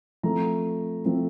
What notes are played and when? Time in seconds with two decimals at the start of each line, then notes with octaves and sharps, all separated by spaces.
0.23 F3 A3 C4 A#5
1.05 F3 A3 C4